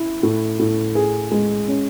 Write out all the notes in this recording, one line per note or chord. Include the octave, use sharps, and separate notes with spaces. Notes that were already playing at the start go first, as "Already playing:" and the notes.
Already playing: E4
A2
A2
G#4
G#3
C#4